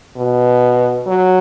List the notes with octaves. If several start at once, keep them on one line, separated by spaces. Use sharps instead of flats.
B2
F#3